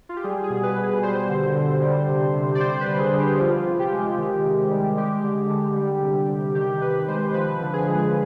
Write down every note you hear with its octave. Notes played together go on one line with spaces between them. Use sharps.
F4
G4
G3 G#4
G#4
B2
B4
B2
G#4
G3 C5
D3
D3
G3
C3
C3
D5
G3 C5
B4
D3
G#4
D3
G4
F3 F4
C3
G4
G#3
D#3
C3
G3
G#3 G4
D3
D3
G3
C3
C3
D#3 G4
C3 B4
G#3 C5
F3 B4
D3
G#4
G#3